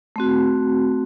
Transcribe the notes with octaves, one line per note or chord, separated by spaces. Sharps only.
A3 C4 F#4